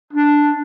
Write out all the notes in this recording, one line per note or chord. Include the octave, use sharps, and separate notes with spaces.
D4